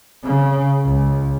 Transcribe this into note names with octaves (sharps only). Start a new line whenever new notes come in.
C#3
C#2